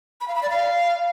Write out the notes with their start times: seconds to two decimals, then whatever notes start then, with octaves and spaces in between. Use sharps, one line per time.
0.21 B5
0.28 F5
0.35 B5
0.43 D5
0.50 F5